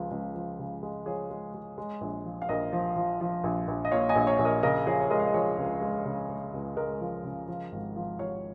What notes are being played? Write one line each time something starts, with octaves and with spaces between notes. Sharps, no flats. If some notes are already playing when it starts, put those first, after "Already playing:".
Already playing: C#2 C#3 F3
C#2
F3
C#3
G#3
F3 G#4 C#5
G#3
G#3
G#3
A#1
F3
F5
A#1 A#4 D#5
F3
F3
F3
A#1
A#1
D#5
A#2 C#5 F5
D#5 G#5
A#1
C#5 F5
A#1
A#4 D#5
C#3 A#4 D#5
F3 G#4 C#5
C#5
G#3 A#4 D#5
F5
D#5
F3 G#4 C#5
C#2
G#3
C#3
G#3
C#2
G#3 A#4 D#5
F3
C#3
F3
G#1
F3
F3 C#5 F5